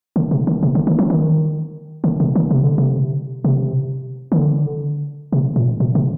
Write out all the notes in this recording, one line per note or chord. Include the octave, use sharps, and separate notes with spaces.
D3
C3
D3
C3
D3
D#3
F3
D#3
D3
C3
D#3
C3
D3
C3
C3
D#3
D3
C3
A#2
A#2
C3